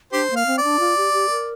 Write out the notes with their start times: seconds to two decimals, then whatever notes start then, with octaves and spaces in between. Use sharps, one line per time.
0.13 D4 G4 C5
0.30 A#3
0.36 F5
0.46 C4
0.58 D5
0.64 D4
0.80 F4
0.97 G4
1.13 G4
1.30 A#4